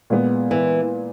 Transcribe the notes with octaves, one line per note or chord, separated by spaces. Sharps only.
A#2 G#3 B3
E3